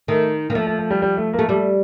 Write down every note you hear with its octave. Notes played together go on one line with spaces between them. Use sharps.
D#3 A3
D#3 A#3
F3 A3
A3
A3
G3
G3
A3
A#3
A3
G3 A3